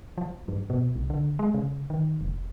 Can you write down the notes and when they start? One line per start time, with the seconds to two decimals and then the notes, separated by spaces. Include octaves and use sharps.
0.18 F3
0.48 G2
0.70 B2
0.96 C2
1.10 D3
1.39 G#3
1.54 C#3
1.90 D#3
2.21 F1